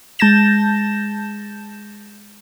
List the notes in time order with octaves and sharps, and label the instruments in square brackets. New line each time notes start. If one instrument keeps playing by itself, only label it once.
[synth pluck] G#3 A5 G6 A6 A#6 E7